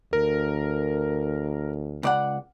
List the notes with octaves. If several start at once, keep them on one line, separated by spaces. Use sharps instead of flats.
D2 A#4
C#2 D5 F#5